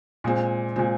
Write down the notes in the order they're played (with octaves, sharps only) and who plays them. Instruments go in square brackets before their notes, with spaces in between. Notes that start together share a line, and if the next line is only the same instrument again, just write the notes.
[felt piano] A#2 G#3 C4
A#2 G#3 C4